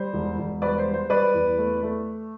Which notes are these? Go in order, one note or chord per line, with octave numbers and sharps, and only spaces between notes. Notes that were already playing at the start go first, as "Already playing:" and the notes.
Already playing: G3 C5
E1
E1
G3 B4 D5
C5
G3
C5
G3 B4 D5
E2
A3
A3